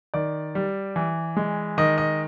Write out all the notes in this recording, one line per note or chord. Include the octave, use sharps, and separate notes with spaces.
D#3 D5
G3
E3
G#3
D#3 D#5
D#5